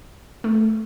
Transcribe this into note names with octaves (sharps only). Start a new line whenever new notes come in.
A3